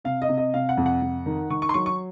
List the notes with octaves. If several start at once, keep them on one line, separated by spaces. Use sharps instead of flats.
C3 F5
D#5
C3
D#5
C3 F5
F#5
F2
F#5
F2
D#3
D#3 C#6
C#6
C6
F#3 C#6
C#6